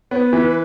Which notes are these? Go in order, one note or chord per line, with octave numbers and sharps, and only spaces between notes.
B3 B4 C#5
E3